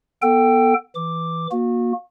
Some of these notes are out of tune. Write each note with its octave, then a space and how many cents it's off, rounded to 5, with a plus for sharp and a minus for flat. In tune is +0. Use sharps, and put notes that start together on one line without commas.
B3 -20 A4 +15 G5 +0
E3 +0 D6 +0
A#3 +25 F#4 -30